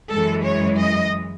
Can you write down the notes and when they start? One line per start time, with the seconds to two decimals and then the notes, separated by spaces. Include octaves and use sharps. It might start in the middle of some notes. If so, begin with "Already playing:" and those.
0.10 F#2 E3 G#3 A4
0.44 C#5
0.79 D#5